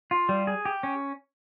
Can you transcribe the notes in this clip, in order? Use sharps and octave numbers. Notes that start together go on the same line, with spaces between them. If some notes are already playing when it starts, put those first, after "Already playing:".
F4
G3
G#4
G4
C#4